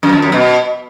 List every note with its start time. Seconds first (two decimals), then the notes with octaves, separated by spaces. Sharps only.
0.03 F#2
0.13 F2
0.22 F#2
0.32 B2